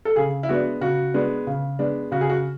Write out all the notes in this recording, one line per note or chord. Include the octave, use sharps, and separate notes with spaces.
A4
C#3 G#4
E4
G#3 B3 D4 F#4
C#3 F#4
G#3 B3 D4
C#3
G#3 B3 D4
C#3 F#4
G#4
F#4